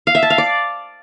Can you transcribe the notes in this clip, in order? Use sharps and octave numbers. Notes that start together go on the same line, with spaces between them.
F5
E5
A5
F5
D5